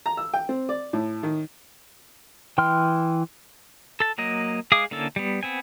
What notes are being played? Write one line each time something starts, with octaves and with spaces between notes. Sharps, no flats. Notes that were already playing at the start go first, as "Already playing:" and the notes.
A#5
E6
G5
C4
D5
A2
D#3
E3 G5 C6 F6
A4 A5
F#3 A#3 D#5
G#3 G#4 F5 D6 D#6
D3 A#3 C#4 E4 A4
G3 B3
B3 C4 G#5